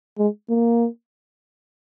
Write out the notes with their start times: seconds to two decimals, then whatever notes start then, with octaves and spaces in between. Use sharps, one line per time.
0.18 G#3
0.50 A#3